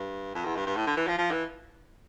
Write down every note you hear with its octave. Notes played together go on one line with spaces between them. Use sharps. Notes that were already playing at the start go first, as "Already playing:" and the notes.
Already playing: G2
F2
E2
G2
G2
A2
D3
E3
F3
F3
E3